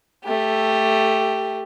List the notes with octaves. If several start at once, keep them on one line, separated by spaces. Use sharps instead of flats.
A3 G4